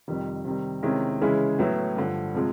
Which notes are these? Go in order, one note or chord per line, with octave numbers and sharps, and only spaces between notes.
F2 C3 D#3 G3
C3 D#3 G3
C3 D#3 G#3 C#4 E4
C#3 E3 G#3 C#4 E4
A2 F#3 B3 E4
G2 D3 F3
C3 F3 G#3